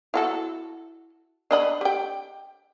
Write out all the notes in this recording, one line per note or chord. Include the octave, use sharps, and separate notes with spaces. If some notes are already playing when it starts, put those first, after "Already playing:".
E4 F#4 A4
D4 D#5 B5
G4 G5